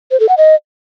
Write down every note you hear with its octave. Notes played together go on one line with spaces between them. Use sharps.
C5
A4
F#5
D#5